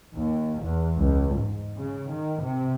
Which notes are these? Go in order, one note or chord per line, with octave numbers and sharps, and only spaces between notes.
D#2
E2
C#2
G#2
C#3
D#3
C3